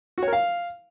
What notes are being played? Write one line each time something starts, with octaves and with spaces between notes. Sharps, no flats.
F#4
C#5
A#4
F5